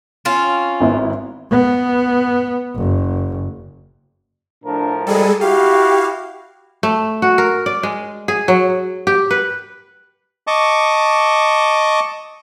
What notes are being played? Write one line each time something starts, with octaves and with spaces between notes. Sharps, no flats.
C4 C#4 F4
G#1 B3 E4
B3
F#1
A2 F3 D4 A#4
G3 G#3 G#4 A4
E4 F#4 G4 F5
A3
F#4
A#4
D5
G#3
G#4
F#3
G4
B4
D#5 A5 C#6 D6